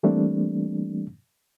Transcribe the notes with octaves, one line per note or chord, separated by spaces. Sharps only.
E3 G3 A3 A#3 C4 D4